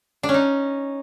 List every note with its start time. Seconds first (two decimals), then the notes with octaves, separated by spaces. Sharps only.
0.23 D4
0.29 C#4
0.34 D#4